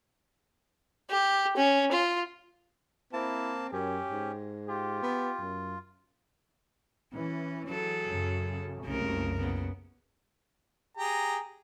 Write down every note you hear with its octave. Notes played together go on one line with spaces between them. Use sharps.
G4
C#4
F4
A#3 C4 E4 A5
F#2 C#4 G4
G#2
F4 G4
B3
F#2
E3 C#4
F#3 G#4 A4
F#2 C#3
F#1 C2 C#3 A3 A#4
C#3 B3
G4 G#4 A#5